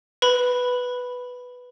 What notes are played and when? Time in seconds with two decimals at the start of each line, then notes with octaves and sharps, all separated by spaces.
0.22 B4 B5